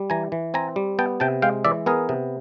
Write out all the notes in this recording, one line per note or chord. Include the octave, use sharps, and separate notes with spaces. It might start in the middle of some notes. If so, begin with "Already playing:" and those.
Already playing: G3
E3 G#5 A#5
E3
C4 G#5 A#5
G3
B3 G5 A5
C3 G5 A5
G#3 F5 G5
E3 D5 E5
B3 G#4 A#4
C3